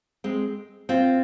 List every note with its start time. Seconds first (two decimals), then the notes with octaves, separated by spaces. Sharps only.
0.24 G#3 C4
0.89 C4 F4